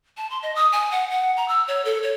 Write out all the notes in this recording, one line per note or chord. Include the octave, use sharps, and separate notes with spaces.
A5
C6
D#5
D#6
G#5
F#5
F#5
A#5
E6
C#5
A4
C#5